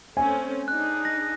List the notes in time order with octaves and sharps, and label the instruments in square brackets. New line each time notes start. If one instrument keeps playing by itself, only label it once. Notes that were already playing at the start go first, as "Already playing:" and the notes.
[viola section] A3 C4 C#4 [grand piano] G#5
[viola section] D4 D#4 G#4 [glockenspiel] F#6
[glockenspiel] A#6